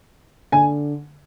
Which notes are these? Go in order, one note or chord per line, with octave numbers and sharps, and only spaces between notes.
D3 G#5